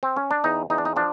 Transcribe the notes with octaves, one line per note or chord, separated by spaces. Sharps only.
C4
C#4
D4
E2 D#4
E2 D#4
D4
D#4
F3 D4